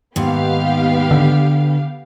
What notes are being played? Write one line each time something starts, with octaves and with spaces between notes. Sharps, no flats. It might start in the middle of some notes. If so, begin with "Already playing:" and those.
D#2 G#2 B3 G4 F5
D3